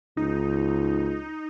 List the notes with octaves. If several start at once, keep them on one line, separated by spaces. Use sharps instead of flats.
C#2 D#4